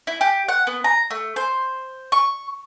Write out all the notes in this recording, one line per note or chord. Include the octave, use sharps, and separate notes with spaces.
E4
G4
F#5
B3
A#5
A3
C5
C#6